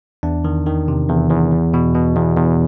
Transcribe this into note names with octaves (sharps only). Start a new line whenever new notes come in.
E2 D4
D#3
D#3
C3
E2
E2
E2
B2
B2
E2
E2